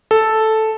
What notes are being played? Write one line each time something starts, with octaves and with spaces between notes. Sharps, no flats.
A4